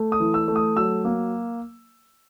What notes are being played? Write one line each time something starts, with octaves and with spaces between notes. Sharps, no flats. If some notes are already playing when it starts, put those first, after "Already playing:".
Already playing: A3
D#6
E3
E6
A3
D#6
F#3 E6
A#3